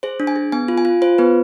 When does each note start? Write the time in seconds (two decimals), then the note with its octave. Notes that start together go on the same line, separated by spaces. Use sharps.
0.03 G#4 C5
0.20 D4
0.27 G#5
0.36 G#4
0.52 B3 G#5
0.68 F4
0.78 G#5
0.85 F4
1.02 F4 C5
1.18 B3 B4